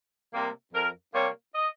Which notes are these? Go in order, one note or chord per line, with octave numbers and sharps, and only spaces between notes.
C3 G3 A#3
F2 A#4
C3 G3 A#3 C#5
D#5